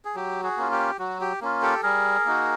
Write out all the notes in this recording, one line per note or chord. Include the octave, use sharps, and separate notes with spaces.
G#4
F#3 G4
F#4 G#4
A#3 C#4 F4
G4
F#3 F#4
G4
A#3 C#4 F4
G4 A4
G3 G#4 A#4
A#3 D#4 F#4